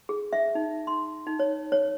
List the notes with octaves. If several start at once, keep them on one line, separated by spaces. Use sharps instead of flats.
G#4
E5
D#4
C6
D#4
C#5
C#5